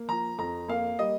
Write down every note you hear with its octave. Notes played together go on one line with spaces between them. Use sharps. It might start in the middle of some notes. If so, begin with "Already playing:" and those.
Already playing: A#3
F3 A#5
F2 A#5
A#3 F5
G3 D#5